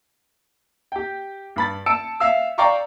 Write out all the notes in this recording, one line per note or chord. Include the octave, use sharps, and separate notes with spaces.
G4 G5
G2 B5 A6
A5 E6 C#7 D7
E5 F5 E6
D5 F5 G5 A#5 C#6 D6